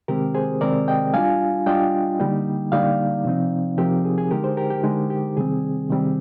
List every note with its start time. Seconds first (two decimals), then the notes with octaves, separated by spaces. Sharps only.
0.08 C3 D#3 G#3 C4 G4 A#4
0.35 G#4 C5
0.61 C3 D#3 G#3 C4 A#4 D5
0.88 D#5 G5
1.14 G3 D4 F4 F5 G#5
1.66 G3 D4 F4 D#5 G5
2.19 D3 G3 A#3 D#4
2.72 D3 G3 A#3 D#4 D5 F5
3.25 C3 F3 C4 D#4
3.78 C3 F3 C4 D#4 G4 A#4
4.05 G#4
4.18 G#4
4.31 D3 G#3 D#4 G4 A#4
4.44 G#4 C5
4.57 G4 A#4
4.70 G4
4.83 D3 G#3 D#4
5.10 G4
5.37 C3 D#3 G3 C4 G#4
5.89 C3 D#3 G3 C4